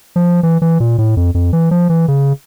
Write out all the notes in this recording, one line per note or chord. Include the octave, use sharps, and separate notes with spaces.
F3
E3
E3
A#2
A2
F2
F2
E3
F3
E3
C#3